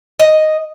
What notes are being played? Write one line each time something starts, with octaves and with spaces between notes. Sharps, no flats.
D#5